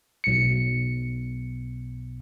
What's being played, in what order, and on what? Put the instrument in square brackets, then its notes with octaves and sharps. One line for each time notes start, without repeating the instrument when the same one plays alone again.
[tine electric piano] B1 C#7